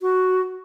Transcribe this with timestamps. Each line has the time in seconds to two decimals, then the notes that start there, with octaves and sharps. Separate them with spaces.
0.01 F#4